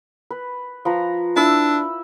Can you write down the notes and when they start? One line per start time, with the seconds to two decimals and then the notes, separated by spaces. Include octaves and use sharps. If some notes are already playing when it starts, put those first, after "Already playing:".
0.31 B4
0.85 F3 B4 A#5
1.36 D4 E4 B5 E6